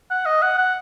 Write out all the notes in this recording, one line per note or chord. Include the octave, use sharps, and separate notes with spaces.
F#5
D#5
F#5
F#5